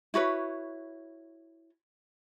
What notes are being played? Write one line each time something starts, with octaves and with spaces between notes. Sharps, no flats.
E4 F#4 B4 C#5